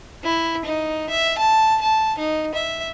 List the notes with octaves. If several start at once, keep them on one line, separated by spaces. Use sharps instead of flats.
E4
D#4
E5
A5
A5
D#4
E5